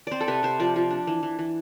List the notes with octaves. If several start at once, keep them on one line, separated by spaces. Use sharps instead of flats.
C4 C5 D5
A4
C3 B4
C3 C5
F3 D5
F3
D4
E3
E3
E3